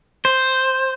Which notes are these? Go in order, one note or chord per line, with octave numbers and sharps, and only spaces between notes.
C5